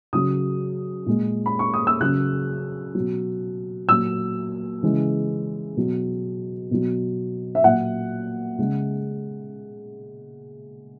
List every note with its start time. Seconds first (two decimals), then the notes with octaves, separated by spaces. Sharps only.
0.13 C#3 F#3 D#6
1.06 A#2 G#3
1.46 B5
1.59 C#6
1.74 D#6
1.87 E6
2.00 C#3 F#3 F#6
2.95 B2 F#3
3.89 A#2 F#3 E6
4.83 C#3 E3 G#3
5.77 B2 F#3
6.71 B2 F#3
7.55 E5
7.64 A#2 F#3 F#5
8.59 C#3 G#3